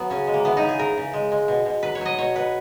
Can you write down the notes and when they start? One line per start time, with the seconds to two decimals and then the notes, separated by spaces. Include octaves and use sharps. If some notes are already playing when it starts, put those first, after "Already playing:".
Already playing: F#3 B3
0.10 C#3 C#4
0.27 G#3
0.34 A#3
0.45 E3 B3
0.57 D#4
0.62 C#3
0.69 G#4
0.79 C#3 A#4
0.97 C#3
1.13 G#3
1.32 G#3
1.48 B2
1.66 B2
1.83 F#3 B4
1.95 C#5
2.01 F#3 D#5
2.18 B2 C#5
2.35 B2 B4